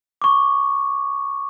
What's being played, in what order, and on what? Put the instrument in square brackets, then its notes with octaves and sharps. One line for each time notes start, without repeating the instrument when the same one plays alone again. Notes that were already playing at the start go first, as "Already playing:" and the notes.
[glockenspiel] C#6 D6